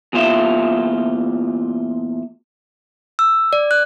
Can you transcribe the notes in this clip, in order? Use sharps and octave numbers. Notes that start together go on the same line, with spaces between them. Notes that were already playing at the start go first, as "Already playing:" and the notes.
E2 A#2 F4 E5
E6
D5
F#6